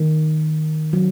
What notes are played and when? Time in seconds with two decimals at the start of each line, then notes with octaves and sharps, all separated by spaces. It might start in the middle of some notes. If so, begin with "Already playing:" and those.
Already playing: D#3
0.93 F#3